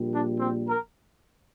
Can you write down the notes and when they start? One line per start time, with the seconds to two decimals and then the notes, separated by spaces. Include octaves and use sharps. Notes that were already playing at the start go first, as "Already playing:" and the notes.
Already playing: A#1 A#2 G3
0.11 D4
0.39 C4
0.68 A#4